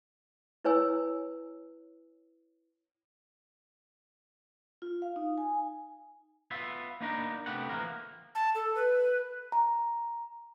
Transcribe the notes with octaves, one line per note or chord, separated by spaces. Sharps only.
E4 B4 C#5 G#5 E6
F4
F5
D#4
G#5
B3 F4 E5
A#3 B3 D4 D#4 A#4 B4
C3 A3 B3 G4 F#5
E3 F3 A#3 A#4
A5
A4
B4
A#5